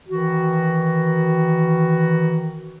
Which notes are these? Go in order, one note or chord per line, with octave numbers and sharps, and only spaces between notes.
D#3 E3 F#4